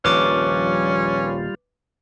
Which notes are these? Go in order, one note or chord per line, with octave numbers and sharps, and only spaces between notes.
D#1 A#1 F3 G3 C#4 F4 B4 D6